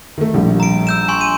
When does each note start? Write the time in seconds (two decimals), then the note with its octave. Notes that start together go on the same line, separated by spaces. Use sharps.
0.18 D#3 A3
0.34 A#1 G3
0.60 A#5 D7
0.87 E6 G6 E7
1.08 G#5 C6 C#6
1.21 D#7